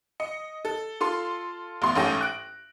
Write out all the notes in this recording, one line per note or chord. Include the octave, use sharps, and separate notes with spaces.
D#5 C#7
A4
F4 A4 C6
A1 B2 C6
A1 G#2 C#4 A4 G5 A#6
F#6 D7